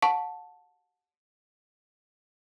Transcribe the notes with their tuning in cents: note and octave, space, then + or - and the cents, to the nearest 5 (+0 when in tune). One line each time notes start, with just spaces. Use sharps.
F#5 -35 A5 +0 C#6 +0